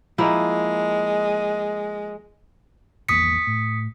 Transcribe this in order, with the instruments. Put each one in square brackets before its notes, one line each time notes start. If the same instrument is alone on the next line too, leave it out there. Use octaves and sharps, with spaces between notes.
[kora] F3 A#3 E4 [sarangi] G#3
[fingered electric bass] G#1 E2 A#3 [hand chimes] D#6 B6 C#7
[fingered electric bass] A2